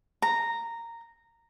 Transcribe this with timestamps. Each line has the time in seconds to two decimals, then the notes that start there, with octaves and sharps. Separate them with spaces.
0.22 A#5